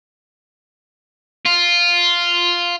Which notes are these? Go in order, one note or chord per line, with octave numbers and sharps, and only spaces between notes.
F4